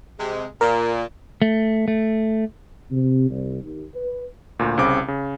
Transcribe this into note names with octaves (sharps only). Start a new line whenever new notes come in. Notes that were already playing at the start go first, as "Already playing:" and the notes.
C3 G#3
A#2 A#4
A3
A3
C3
C2
D#2
B4
D2 A#2
C2 C#3 C4 D6
C#3